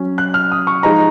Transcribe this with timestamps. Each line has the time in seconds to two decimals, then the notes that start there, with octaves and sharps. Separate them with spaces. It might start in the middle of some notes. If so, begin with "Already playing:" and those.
Already playing: F#3 C#4
0.18 F#6
0.34 F6
0.52 D#6
0.67 C#6
0.83 F3 G#3 D#4 A#5